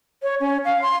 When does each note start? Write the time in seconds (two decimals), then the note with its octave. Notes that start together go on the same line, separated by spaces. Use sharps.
0.23 C#5
0.40 C#4
0.65 F5
0.82 C6